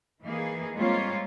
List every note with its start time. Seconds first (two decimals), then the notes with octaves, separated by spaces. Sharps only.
0.23 E3 A#3 D#4 G#4
0.76 G3 G#3 A#3 C4 F4 C#5